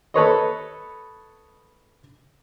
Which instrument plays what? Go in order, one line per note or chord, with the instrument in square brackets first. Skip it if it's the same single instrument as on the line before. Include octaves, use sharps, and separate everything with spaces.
[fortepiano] A4 B4 C#5 D#5